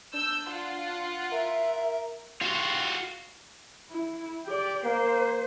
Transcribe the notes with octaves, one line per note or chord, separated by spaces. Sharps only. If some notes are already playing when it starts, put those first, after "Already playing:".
D4 E6 G6
F4 F#5
A#4 E5
F4 F#4
E4
G4 D5
A#3 C5